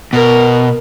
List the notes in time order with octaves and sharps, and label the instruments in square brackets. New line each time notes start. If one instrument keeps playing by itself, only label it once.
[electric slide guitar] B2 [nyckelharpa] A#4